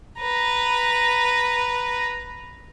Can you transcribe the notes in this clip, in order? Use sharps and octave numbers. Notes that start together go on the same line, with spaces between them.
B4 A#5